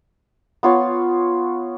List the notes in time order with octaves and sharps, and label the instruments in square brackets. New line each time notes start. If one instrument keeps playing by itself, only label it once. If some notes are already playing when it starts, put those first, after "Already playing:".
[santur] B3 F4 C#5 F5